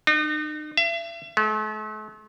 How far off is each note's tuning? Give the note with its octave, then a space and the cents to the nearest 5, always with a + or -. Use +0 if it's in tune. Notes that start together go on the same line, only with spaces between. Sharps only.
D#4 -40
E5 +40
A3 -45